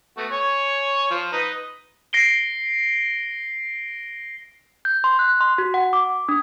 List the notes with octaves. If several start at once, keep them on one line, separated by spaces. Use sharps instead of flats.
A3 B3 F#4
C#5 G#5 C#6
F3
D#4 B4
A#6 C7 D7 G7
G6
C6
F#6
C6
F#4
F#5
D6
D4